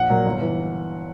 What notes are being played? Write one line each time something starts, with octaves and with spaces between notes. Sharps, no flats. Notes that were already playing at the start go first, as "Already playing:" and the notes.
Already playing: A#1 F#5
A#2 F#3 A#3
G1
E3